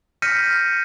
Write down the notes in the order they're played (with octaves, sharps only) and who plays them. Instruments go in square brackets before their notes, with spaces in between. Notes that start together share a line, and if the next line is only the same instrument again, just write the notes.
[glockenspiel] F6 G6 A#6 B6 C#7 D#7